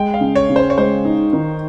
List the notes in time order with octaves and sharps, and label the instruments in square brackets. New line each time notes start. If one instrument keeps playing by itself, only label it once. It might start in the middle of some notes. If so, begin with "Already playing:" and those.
Already playing: [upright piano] G#3 [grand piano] G5
[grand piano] F5
[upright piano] C#3
[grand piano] C#5
[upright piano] C#3
[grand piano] C5
C#5
[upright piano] G#3 [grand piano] C5
[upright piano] D#4
D#3